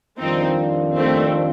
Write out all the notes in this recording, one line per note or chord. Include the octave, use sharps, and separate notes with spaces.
F2 D#3 G3 C4 D4 D#4 F4
A3 C4